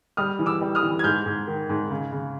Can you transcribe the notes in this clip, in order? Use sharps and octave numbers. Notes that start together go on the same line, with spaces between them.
G3 D#6 F6
E3
D6 E6
G3
D#6 F6
E3
G#6
G#2 F6 G6
G#2
D#3
G#2
C#3
C#3